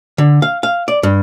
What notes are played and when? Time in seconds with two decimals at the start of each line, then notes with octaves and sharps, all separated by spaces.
0.18 D3
0.42 F5
0.63 F5
0.88 D5
1.03 G2